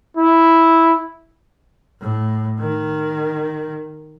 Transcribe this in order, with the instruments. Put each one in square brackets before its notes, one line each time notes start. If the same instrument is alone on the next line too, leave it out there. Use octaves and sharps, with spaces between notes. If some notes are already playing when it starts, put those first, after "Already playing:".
[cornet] E4
[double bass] A2
D#3